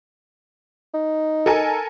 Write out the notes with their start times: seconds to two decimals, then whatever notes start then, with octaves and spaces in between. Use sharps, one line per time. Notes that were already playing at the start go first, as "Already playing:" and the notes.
0.94 D#4
1.46 A4 A#4 G#5